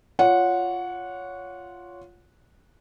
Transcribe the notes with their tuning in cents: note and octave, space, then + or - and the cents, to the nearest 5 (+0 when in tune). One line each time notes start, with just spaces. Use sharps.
F4 +0 C#5 +15 F#5 -15